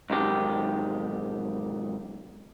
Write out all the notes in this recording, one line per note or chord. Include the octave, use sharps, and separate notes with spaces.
B1 G#2 D#3 G4